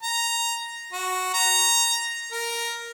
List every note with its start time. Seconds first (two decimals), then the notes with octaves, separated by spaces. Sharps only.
0.03 A#5
0.93 F#4
1.34 A#5
2.32 A#4